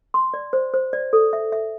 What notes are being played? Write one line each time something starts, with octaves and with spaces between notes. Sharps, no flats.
C6
D5
C5
C5
D5
A4
E5
E5